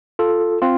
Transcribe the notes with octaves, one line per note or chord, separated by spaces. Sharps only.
F4 A4
C4 F4